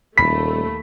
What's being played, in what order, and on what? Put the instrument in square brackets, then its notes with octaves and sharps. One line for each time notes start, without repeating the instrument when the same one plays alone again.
[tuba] D#1 [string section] D#2 A3 [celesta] B5 [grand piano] B6